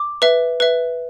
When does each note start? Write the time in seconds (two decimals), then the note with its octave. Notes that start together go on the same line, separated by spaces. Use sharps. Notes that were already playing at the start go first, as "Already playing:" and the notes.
Already playing: D6
0.22 B4 E5
0.60 B4 E5